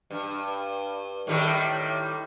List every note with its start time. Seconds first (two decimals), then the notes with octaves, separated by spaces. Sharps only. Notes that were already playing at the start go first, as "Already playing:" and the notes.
0.11 G2
1.27 A2 D#3 G3